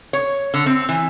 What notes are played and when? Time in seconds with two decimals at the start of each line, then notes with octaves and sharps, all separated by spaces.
0.13 C#5
0.54 D3
0.66 C4
0.89 E3